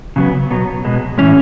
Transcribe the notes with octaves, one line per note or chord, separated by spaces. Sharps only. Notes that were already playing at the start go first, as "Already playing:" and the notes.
C#3 F#3 B3
B2 F#3 B3
B2 G#3 B3
A2 E3 G#3 C#4